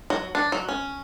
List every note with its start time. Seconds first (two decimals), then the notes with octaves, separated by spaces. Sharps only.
0.10 F#3
0.35 D4
0.52 F#3
0.69 C#4